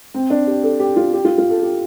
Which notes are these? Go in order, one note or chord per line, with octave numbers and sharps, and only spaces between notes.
C4
D4
G4
A4
G4
F4
G4
F4
F4
A4
G4